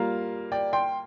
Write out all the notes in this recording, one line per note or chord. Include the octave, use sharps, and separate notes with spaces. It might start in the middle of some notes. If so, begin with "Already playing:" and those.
Already playing: G3 A#3 F4 F5 A#5
D5 G5
G5 C6